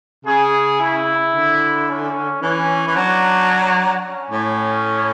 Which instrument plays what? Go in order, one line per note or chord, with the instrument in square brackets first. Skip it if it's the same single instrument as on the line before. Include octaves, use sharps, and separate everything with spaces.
[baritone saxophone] C#3 [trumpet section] G#4
[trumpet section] E4
[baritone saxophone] D3
[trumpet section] C#4
[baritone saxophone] E3 [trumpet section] C#4
[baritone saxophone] E3
[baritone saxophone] F#3 [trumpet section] D4
[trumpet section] C#4
[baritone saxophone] A2